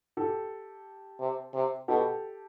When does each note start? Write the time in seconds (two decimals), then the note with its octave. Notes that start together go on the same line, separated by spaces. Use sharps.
0.17 G4 A4
1.20 C3
1.54 C3
1.88 B2 G4 A4